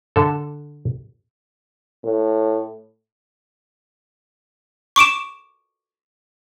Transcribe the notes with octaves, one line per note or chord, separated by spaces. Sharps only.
D3 A4
A2
C#6 D6 D7 E7